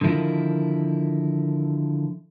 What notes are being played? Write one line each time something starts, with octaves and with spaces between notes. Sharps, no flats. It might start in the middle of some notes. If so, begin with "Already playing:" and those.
D3 D#3 F3 E4 A#4